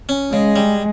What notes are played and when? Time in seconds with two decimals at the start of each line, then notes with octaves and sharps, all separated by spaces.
0.09 C#4
0.32 C#3 G#3
0.56 G3